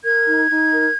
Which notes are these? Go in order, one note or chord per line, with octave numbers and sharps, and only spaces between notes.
A#4 G#6
D#4
D#4
A#4